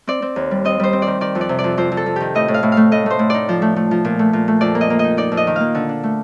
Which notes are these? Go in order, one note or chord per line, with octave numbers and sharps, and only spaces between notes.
C4 D5
C4
D#2
G3
C4 D#5
G3 C5
C4
D#3 D5
D#3 D5
F2
D5
C3
D5
F2
F2 C5
F2
A4
F2
D#3 G4
A2 D#5
A2
F5
A2
A3 F5
A2 D#5
A3 C5
A2
D#4 D5
F3
A3
A3
F3
A#2
A3
A#2
A3
F2 D5
A#3
D#5
A#3
D#4 D#5
D#4 D5
F2
D#5
D#3
A#3 F5
D3
D4
A3